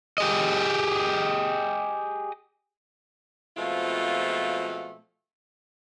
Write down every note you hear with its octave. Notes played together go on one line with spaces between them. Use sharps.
G4 G#4 D#5
B2 F3 G#3 A3 C4 F4